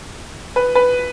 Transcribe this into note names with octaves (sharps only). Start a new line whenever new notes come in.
B4
B4